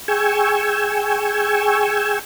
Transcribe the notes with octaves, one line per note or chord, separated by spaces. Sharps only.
G#4 G5 G#5 C#6 E6